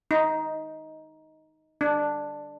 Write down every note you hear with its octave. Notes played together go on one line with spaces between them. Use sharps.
D#4
D4